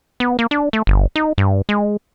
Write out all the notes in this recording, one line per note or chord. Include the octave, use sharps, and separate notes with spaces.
B3
A#3
D4
A3
G1
D#4
G2
G#3